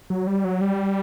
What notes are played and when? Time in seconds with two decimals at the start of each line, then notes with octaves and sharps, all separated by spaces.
0.10 F#3
0.27 G3
0.44 F#3
0.61 G3